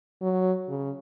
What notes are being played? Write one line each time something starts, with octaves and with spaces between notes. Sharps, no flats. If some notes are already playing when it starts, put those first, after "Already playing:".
F#3
C#3